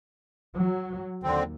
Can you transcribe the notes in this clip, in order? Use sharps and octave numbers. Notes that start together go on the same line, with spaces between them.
F#3
D#2 D3 C4